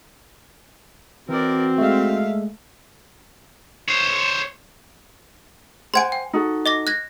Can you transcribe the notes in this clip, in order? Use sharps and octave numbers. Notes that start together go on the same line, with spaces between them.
E3 C4 F#4 A#4 D5
G#3 A3 E5 F5
C5 C#5
C5 F#5 G#5 C6 G#6 D7
G5
D#4 F#4 A4
D#5 D6 A#6
F#6 G#6 A#6